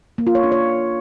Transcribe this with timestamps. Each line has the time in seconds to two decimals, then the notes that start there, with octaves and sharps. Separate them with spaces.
0.18 A#3
0.27 F4
0.35 C#5
0.43 D4
0.52 C#5